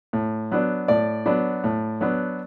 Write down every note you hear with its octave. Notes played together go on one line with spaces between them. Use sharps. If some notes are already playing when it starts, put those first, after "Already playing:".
A2
F#3 B3 D4
A2 D5
F#3 B3 D4
A2
F#3 B3 D4